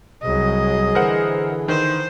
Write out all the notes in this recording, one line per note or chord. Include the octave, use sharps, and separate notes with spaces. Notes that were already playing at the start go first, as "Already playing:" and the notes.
C2 F#3 G#4 D#5
D3 E3 A#4 C5 F#5
D#3 C5